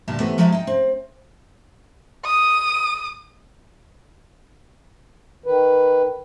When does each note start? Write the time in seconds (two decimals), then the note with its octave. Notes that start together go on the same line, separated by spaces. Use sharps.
0.08 D2 G2 A#2 G4 A5
0.20 C3 E3 A3 B3
0.38 F3 F#3 G#3 A3 C4 E4
0.52 D#4 G5
0.67 C4
2.25 D#6
5.46 D#3 B4